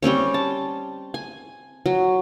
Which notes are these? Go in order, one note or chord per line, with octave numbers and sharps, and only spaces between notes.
G3 C4 C#4 C#5
A5
G#5
F#3